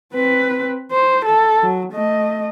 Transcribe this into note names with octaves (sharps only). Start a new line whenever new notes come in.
C4 B4
C5
A4
F#3
A3 D#5